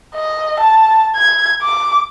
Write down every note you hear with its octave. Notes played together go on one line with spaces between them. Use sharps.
D#5
A5
G#6
D6